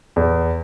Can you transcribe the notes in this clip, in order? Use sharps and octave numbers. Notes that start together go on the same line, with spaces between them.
E2